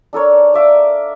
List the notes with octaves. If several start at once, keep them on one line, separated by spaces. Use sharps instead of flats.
D4 A4 A#4 C#5
D5 E5 F5 D6